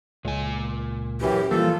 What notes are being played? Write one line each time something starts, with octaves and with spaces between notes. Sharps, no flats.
C#2 A#2 G#5
F#2 E3 G4
E3 F3 G3 A#3 F4 A4